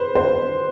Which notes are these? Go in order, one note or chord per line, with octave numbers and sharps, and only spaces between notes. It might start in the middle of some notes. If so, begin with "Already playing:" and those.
Already playing: B4 C5
C5